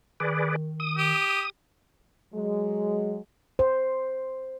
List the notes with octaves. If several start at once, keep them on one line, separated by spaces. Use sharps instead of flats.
D#3 G#4 B4 D5
D#6
G4
F#3 G#3
C5